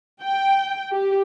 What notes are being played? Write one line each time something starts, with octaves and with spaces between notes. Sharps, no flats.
G5
G4